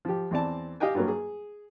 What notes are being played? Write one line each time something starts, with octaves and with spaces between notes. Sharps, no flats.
F3 G4
E2 C4 D5 A5
G4 D#5 F5 G5 G#5
G2 F#3 A#3
G#4